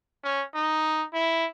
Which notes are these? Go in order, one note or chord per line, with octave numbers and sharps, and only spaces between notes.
C#4
D#4
E4